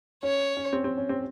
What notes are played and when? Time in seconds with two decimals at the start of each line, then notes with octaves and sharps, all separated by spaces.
0.23 C#4 C#5
0.57 C#4
0.73 C4
0.84 C4
0.98 C#4
1.09 C4